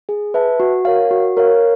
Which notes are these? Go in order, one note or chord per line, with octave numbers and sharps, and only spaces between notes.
G#4
B4 E5 A5
F#4
A#4 C#5 F5
F#4
A#4 C#5 F5